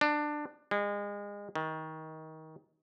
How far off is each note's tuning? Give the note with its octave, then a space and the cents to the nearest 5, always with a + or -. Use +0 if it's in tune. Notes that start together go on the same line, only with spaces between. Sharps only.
D4 +15
G#3 -30
D#3 +25